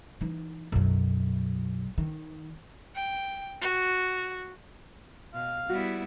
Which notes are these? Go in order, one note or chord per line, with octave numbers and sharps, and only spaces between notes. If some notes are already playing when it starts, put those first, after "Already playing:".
E3 D#4
B1 F#2
D#3
G5
F#4
B2 F5
G3 B3 E4 F#4